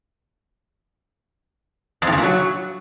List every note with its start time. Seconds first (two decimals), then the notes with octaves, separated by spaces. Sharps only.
2.02 F2
2.07 A2
2.12 C#3
2.18 A#2
2.23 F#3